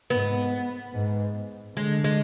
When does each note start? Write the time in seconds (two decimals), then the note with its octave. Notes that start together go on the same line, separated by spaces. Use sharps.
0.10 G#2 B3
0.94 G#2
1.77 D3 G#3
2.04 G#3